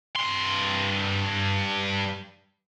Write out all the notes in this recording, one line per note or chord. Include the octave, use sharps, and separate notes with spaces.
G2 C6